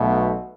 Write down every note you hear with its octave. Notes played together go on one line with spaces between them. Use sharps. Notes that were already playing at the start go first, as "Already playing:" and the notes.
Already playing: B1 B2 A3